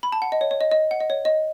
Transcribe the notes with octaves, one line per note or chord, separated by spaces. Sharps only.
B5
A5
F#5
D#5
C#5
C#5
D#5
D#5
F#5
D#5
C#5
D#5